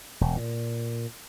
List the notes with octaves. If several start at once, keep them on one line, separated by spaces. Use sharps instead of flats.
E1
A#2